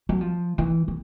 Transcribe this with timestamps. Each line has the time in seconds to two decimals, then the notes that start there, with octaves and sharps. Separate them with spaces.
0.09 F#3
0.21 F3
0.58 E3
0.88 E3